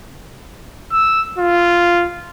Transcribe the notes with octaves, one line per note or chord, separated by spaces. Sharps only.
E6
F4